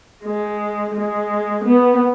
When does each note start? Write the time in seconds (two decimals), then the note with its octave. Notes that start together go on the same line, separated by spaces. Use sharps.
0.24 G#3
0.95 G#3
1.65 B3